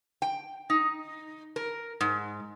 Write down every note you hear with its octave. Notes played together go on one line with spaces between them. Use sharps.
G5
D#4
A#4
G#2